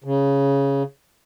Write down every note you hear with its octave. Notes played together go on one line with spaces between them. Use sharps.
C#3